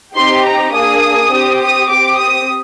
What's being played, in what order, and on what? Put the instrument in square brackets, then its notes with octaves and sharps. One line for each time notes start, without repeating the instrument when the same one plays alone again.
[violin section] C4 D#4 G4 C6
A#5
A#3 D4 G#4 D#6
C4 G4
D#6
C4 G4 D6
D#6